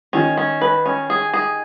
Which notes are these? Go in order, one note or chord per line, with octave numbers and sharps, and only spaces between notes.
D#3 C#4
C#4
B4
C#4
G#4
G#4